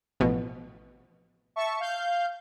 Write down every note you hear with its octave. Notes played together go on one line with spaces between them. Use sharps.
A1 B2 F3
E5 A5 C#6
F5 G6